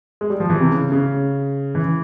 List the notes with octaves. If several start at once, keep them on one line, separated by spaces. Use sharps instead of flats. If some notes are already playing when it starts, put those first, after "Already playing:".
G#3
G3
F3
E3
C3
C#3
C#3
E3